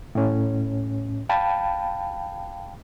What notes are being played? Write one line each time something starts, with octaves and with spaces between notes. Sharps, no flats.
A2 C#4
F5 G5 A5 B5